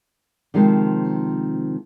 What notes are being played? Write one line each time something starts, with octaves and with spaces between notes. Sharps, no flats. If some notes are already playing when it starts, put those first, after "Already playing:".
C3 D#3 F3 G#3